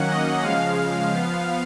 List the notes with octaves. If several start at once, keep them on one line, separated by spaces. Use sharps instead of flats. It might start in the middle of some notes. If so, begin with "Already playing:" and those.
Already playing: D#3 F#3 A#3 C#4 F#5
D#5
C#3 F3 G#3 F5
F3 B3